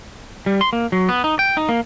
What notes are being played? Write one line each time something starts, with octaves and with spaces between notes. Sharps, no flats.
G3
C6
A#3
F#3
B3
D#4
G5
D#4
A#3